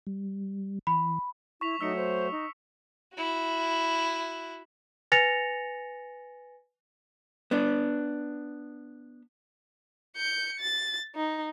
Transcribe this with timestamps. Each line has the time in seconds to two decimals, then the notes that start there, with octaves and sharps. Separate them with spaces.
0.07 G3
0.87 E3 B5
1.61 E4 C#6 B6 F7
1.81 F#3 A3 D#4 E6 B6 C#7
1.96 C5
2.32 D#4
3.16 E4 F#4
5.12 B4 G#5 A6 A#6 C#7 F7
7.51 B3 D4
10.16 G6 C#7
10.60 A6
11.15 D#4